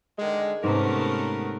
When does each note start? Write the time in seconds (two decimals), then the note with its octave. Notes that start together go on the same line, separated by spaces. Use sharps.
0.19 D3 D#3 G#3
0.64 G#2 C3 A3 B3 C#4 A#4